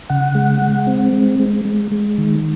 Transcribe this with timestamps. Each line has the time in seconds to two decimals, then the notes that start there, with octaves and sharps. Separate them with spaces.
0.10 C#3 F#5
0.35 G#3
0.62 G#3
0.87 C4
1.13 G#3
1.39 G#3
1.65 G#3
1.92 G#3
2.18 D#3